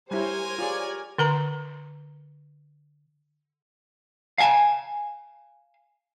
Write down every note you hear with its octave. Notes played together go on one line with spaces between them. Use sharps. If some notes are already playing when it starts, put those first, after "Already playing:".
G3 E4 G4 A#4 C5 C#5 G#5
F4 G4 G#4 C#5 D5
D3 A#4 A#5
F5 F#5 G#5 A5